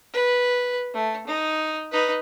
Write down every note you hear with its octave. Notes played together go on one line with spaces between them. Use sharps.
B4
A3
D#4
D#4 B4